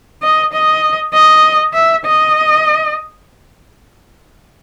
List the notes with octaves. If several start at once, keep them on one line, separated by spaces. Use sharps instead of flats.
D#5
D#5
D#5
E5
D#5